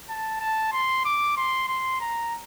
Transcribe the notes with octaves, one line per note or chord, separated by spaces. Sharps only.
A5
A5
C6
D6
C6
C6
A#5